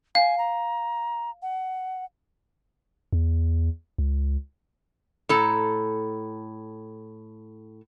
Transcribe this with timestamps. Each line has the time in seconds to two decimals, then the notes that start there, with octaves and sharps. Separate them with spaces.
0.15 F5 G#5
0.38 A#5
1.42 F#5
3.13 E2
3.98 C#2
5.29 A2 A4 A#5